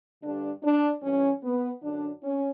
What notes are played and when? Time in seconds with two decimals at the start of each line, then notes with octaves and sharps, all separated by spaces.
0.23 G2 D3 D4
0.64 D4
1.03 G2 E3 C#4
1.43 B3
1.83 F#2 D3 D4
2.23 C#4